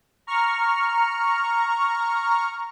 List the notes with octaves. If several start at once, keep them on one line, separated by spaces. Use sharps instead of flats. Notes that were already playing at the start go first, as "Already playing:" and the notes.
A#5 C#6 F6